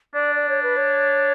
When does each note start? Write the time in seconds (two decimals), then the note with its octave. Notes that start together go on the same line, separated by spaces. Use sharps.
0.14 D4 D5
0.35 D5
0.49 C#5
0.63 B4
0.77 C#5